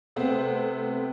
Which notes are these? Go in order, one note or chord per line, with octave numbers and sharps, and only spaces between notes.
C3 A3 B3 C4